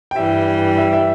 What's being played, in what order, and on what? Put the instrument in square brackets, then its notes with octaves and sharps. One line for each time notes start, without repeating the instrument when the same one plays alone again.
[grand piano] G5
[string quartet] G2 E3 G3 [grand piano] E5
[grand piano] E5
E5